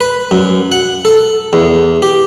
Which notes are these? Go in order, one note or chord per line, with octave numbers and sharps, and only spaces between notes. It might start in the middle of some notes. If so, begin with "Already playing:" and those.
B4
F#2
F#5
A4
E2
G4